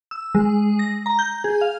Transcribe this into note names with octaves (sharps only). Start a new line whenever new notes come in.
E6
G#3
A#6
A#5
G6
G#4
F5